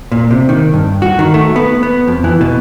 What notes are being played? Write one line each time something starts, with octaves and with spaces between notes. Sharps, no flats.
A#2
C3
D#3
G2
F#4
D#3
A3
B3
B3
F2
E3
B2